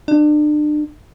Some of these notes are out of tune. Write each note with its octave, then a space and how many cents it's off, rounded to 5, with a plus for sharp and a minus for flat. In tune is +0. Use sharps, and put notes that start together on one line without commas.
D4 +35